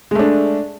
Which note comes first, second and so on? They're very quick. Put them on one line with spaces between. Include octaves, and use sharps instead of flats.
G#3 A3 D4